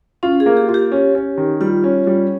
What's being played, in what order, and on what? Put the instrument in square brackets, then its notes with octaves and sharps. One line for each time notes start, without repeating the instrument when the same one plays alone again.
[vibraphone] C#4 [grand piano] F4
[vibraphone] G#4
[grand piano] A#3
[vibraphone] G4
[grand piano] F4
[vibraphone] G4
[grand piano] C#4
C#4
D#3
[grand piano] G3 [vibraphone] F4
[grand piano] C#4
G3